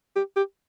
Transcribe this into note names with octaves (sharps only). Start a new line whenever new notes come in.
G4
G4